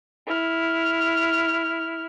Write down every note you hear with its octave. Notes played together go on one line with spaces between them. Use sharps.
E4 F6